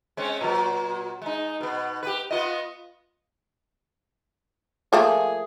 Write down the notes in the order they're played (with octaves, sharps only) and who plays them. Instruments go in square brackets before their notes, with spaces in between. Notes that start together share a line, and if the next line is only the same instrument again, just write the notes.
[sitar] G#3 C4 C#4
A#2 F#3
G#3 D#4
B2 B3
G4 B4
B3 F4 D#5
[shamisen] F3 A3 A#3 [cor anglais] G#4